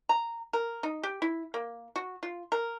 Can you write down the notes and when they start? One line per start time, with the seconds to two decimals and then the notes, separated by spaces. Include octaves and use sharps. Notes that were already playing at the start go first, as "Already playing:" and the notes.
0.09 A#5
0.53 A#4
0.83 D#4
1.03 G4
1.22 E4
1.54 A#3
1.96 F#4
2.23 F4
2.52 A#4